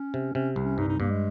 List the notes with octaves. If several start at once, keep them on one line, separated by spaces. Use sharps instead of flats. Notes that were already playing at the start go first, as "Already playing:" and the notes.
Already playing: C#4
C3
C3 C#4
C2
C#4
G2 D#4
D#4
G2 A#3
G#3